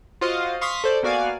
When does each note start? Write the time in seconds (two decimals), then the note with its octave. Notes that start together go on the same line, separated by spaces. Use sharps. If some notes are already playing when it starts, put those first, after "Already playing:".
0.21 F4 F#4 C5 D#5 F5
0.61 F5 C6 C#6 D#6 B6
0.84 A4 C5 D5
1.03 A#3 B3 F#4 D5 F5 G#5